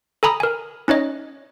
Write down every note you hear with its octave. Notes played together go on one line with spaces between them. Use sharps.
A4 G#5 A#5 B5 D#6
A#4 G#5
C#4 D#4 C#5 D#5